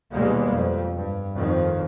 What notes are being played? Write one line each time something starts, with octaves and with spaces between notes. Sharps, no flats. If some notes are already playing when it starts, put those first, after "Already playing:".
D#2 B2 G3 G#3 A#3
F2
G2
F2 D#3 F3